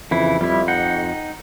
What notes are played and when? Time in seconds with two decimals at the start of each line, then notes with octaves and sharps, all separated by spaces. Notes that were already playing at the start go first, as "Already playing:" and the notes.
0.11 F2 C#3 E3 E4
0.41 F2 G3 E4
0.68 D#4 F#5 G5